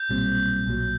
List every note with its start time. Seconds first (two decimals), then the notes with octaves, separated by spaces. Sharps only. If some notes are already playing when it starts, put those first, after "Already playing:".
Already playing: G6
0.09 B1 A#2 G3 C4
0.66 B1 A#2 F#3